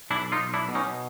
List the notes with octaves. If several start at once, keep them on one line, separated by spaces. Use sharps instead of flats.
B1 D4 E4
D#4 F4
B1
D4 E4
B2
C#4 D#4